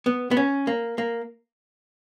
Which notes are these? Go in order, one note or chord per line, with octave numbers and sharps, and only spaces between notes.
B3
B3
C#4
A#3
A#3